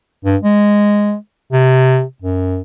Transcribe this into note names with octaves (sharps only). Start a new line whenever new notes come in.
G2
G#3
C3
F#2